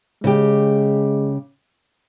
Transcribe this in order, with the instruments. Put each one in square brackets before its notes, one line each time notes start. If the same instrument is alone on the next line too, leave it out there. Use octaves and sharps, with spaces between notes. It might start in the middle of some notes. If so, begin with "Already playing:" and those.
[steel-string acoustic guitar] C#3 G4 [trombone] G#3